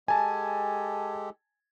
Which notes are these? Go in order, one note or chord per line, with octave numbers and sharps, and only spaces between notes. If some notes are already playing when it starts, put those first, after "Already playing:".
G#3 G4 A4 G#5 A5